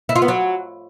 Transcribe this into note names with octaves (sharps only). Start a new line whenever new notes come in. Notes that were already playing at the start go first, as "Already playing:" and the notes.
E4
F4
B3
F#3